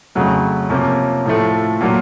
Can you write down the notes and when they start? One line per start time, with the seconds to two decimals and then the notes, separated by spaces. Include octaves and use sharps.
0.15 F2 C#3 F#3 A3
0.70 C3 F3 A#3 C#4
1.26 A2 F3 A3
1.81 A#2 F#3 A#3